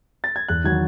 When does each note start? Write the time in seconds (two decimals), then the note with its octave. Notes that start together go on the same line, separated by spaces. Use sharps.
0.24 A6
0.36 G#6
0.48 E2 F#6
0.64 D#3 F#3 G#6